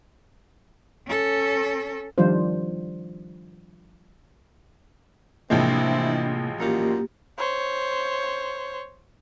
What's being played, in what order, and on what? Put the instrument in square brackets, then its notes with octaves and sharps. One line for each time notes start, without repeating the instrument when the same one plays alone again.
[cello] C#4 A4
[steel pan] D#3 F3 G3 D4 F4 C5
[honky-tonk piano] A1 F3 G#3 [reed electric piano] C3 A#3 [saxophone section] C4 E4 [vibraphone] D4
[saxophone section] F#2 A#2 [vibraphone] A#3 G4
[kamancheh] C5 C#5